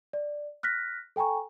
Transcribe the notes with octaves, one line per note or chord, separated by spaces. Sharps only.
D5
F6 F#6 A#6 B6
A4 G5 G#5 A#5 C#6